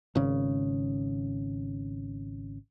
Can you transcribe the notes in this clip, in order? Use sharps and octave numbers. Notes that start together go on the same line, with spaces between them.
G#1 C#3